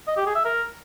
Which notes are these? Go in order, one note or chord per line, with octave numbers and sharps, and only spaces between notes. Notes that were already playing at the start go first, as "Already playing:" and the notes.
D#5
G4
G#4
E5
A#4